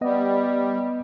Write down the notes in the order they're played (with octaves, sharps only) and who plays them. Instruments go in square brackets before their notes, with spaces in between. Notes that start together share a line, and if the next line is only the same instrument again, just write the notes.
[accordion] G3 [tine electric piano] B3 D#5